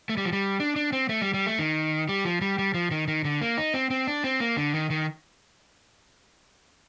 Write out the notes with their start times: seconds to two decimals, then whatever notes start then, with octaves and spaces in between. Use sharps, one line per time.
0.09 A3
0.17 G3
0.25 F3
0.33 G3
0.60 D4
0.76 D4
0.93 C4
1.09 A3
1.22 G3
1.34 G3
1.47 A3
1.59 D#3
2.09 G3
2.25 F3
2.41 G3
2.59 G3
2.74 F3
2.91 D#3
3.08 D#3
3.25 D3
3.41 A#3
3.58 D#4
3.74 C4
3.90 C4
4.07 D4
4.24 C4
4.40 A#3
4.57 D3
4.74 D#3
4.90 D#3